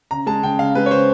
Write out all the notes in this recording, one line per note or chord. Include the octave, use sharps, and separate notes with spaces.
C#3 A#5
G#3 A5
C#3 G5
C#3 F5
G#3 B4
C#5
C#3 C5